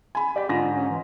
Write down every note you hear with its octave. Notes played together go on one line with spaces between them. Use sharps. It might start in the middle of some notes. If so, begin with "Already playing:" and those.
G#5 B5
G4 D5 B6
G#2 D3 F4 A#6
C#4
E3